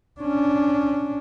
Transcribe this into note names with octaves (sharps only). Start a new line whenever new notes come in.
C#4 D4